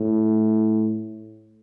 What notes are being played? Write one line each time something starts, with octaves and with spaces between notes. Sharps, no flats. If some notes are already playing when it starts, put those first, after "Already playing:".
Already playing: A2